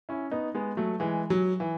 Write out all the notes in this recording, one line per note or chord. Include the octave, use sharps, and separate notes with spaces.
C#4 E4
B3 D#4
G#3 B3
F#3 A3
E3 G#3
F#3
E3